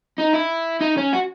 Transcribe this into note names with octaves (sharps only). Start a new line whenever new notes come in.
D#4
E4
D#4
C#4
F#4